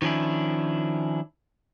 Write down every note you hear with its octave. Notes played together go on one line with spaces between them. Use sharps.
D#3 F3 C#4 D4 E4